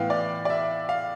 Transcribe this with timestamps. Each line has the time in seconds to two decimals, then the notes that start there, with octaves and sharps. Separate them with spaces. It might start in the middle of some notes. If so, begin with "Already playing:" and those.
Already playing: A2 E3 B3 F5 G5
0.10 D5
0.45 D5
0.50 E5
0.89 F5